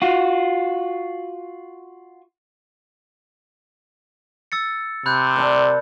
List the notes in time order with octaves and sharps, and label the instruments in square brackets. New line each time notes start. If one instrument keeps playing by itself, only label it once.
[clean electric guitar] F4 F#4
[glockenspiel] E6 A6 C#7
[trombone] C3 [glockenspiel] B5 F#6 G6
[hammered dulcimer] A#4 D5 A5